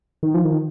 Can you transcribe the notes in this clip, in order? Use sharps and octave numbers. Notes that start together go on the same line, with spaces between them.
D#3
F3
D#3